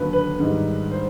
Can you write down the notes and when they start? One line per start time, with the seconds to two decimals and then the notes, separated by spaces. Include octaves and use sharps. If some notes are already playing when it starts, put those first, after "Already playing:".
Already playing: D#2 D3 F#3 B4
0.13 B4
0.39 G#2 D#3 G3
0.92 C5